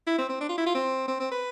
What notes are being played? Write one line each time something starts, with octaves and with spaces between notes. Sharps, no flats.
E4
C4
C4
D4
F4
E4
F4
C4
C4
C4
B4